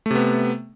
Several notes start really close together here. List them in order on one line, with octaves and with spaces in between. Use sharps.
A3 C3 B3